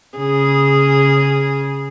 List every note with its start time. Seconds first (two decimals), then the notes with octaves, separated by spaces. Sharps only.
0.18 C#3 G#4